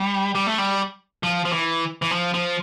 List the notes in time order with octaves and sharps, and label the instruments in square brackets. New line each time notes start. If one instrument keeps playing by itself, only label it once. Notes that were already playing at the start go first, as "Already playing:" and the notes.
Already playing: [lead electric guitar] G3
G3
A3
G3
F3
F3
E3
E3
F3
F3